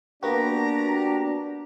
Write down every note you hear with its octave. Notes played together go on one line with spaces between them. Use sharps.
A#3 B3 D4 F#4 G4 A#5